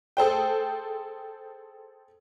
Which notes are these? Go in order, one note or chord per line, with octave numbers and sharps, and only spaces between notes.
G#4 A4 C5 G5